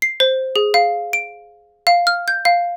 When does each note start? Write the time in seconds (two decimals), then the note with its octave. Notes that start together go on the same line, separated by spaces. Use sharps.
0.02 C7
0.20 C5
0.56 G#4
0.74 F5
1.13 D7
1.87 F5
2.07 F6
2.28 G6
2.45 F5